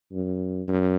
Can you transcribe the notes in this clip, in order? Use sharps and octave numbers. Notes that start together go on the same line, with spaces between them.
F#2
F#2